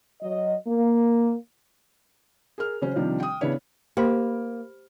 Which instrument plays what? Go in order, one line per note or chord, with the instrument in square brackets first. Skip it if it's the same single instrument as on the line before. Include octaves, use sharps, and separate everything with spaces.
[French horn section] F#3 D#5
A#3
[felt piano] G#4 A#4 F6
C#3 F#3 C#4 C5
C3 D#3 F3 G3 C4 D4
G5 D#6
C#3 B3 D4 E4 C#5
[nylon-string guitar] A#3 [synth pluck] G4 C5 B5